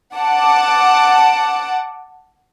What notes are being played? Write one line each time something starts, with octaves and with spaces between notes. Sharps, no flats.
F#5 A5 D6